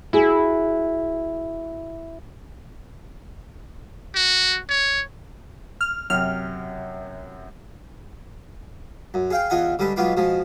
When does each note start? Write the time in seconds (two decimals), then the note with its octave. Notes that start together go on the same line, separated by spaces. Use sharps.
0.13 E4 F#4 G#4
4.15 F#4
4.70 C#5
5.81 F6
6.10 F#2 C3 F6
9.14 F#2
9.30 G#4 F5 G5
9.50 E2 F4 D#5 F#5 G#5
9.79 D3 G3 G#3 B4
9.96 B1 G#3 B3 F4 B4 D6
10.17 B2 F3 G#3